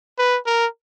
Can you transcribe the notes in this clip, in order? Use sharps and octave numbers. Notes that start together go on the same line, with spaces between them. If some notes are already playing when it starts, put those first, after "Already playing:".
B4
A#4